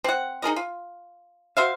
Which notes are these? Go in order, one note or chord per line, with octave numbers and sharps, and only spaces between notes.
C4 F#5
D#4 G#4 A#4 D#5
F4
F#4 C5 E5 F5